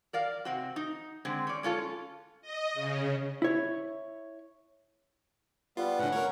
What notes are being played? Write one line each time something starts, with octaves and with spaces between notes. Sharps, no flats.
A#4 D5 F5
C3 C4 F#4
D#4
D3 G#3 C4
C#4 D5
G#3 C#4 F4 A4
D#5
C#3
E4 C#5
G3 B3 F4
A2 D3 C#4 F#5
A#4 C#5